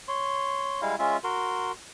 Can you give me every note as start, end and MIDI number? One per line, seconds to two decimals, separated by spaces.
0.08 0.81 73
0.08 0.81 84
0.82 0.96 55
0.82 0.96 56
0.82 0.96 64
0.82 0.96 77
0.99 1.17 56
0.99 1.17 61
0.99 1.17 65
0.99 1.17 76
1.24 1.72 66
1.24 1.72 70
1.24 1.72 84